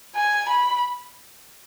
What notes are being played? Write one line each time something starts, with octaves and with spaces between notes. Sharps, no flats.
G#5
B5